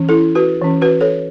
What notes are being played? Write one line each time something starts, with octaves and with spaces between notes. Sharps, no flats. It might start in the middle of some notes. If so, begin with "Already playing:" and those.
Already playing: E3 C#4
E4 A4
F#4 B4
E3 C#4
F#4 B4
A4 C#5